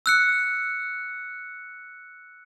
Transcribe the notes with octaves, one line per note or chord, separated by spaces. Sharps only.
E6 F#6 C#7